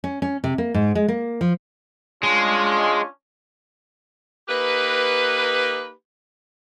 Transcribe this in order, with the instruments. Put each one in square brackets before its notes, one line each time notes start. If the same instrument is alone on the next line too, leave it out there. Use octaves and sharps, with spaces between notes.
[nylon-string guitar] C#4
C#4
C3
A#3
G#2
G#3
A#3
F3
[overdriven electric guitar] G#3 [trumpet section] C#4 D4 F4
[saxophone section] A#3 D#4 G4 B4